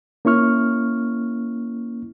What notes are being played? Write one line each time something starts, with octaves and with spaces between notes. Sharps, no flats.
A#3 C#4 E4 C#6 F6